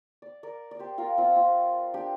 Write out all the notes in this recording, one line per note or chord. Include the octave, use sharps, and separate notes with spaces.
D5
A#4 D5
D5
G4 C5
F4 A#4
C4 F4
C4 F4
D4 G4